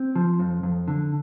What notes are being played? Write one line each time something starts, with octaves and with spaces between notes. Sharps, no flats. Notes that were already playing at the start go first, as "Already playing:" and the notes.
Already playing: C4
F3
F2
F2
D3